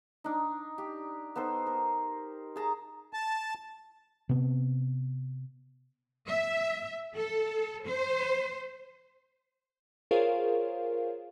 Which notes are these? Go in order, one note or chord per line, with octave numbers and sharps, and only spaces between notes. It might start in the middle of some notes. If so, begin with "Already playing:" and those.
D4 D#4
G4
B3 D#4 A4 C5
A#4
G#4 A5 A#5
A5
C3 B3
E5
A4
C5
F4 G#4 A#4 C5 C#5 F5